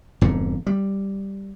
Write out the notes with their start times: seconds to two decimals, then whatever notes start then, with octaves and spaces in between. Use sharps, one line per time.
0.21 E1 F2 G#2 D3
0.67 G3